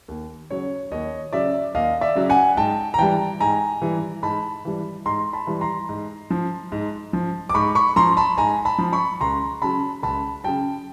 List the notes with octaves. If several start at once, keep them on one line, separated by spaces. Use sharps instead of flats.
D#2
C#3 F#3 C#5
D#2 C#5 D#5
C#3 F#3 D5 E5
D#2 D#5 F5
D5 E5
C#3 F#3
F#5 G#5
G#2 G5 A5
A#5
E3 G3 G5 A5
G#2 G#5 A#5
E3 G3
G#2 A5 B5
E3 G3
G#2 A#5 C6
A5 B5
E3 G3
A#5 C6
G#2
F3
G#2
F3
D6
G#2 B5 C#6
B5 C#6
F3 A#5 C6
A5 B5
G#2 G#5 A#5
A5 B5
F3
B5 C#6
C#2 A#5 C6
C#3 F#3 A5 B5
C#2 A5 B5
C#3 F#3 G5 A5